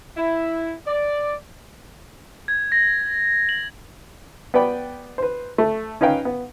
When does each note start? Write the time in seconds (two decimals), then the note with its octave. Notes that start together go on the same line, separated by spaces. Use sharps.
0.17 E4
0.87 D5
2.48 G#6
2.72 A#6
3.49 F#7
4.54 B3 B4 D5 G5 B5
5.18 B4 C5
5.58 A3
6.01 C#4 D#4 B4 F5 G5
6.25 B3